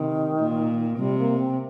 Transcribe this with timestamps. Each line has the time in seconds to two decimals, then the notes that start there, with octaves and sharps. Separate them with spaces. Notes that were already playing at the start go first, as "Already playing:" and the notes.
Already playing: C3 D#3
0.38 A#2
0.98 C3 G3
1.18 A#3
1.39 C4